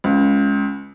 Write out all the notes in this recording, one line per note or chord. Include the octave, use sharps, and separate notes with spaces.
C#2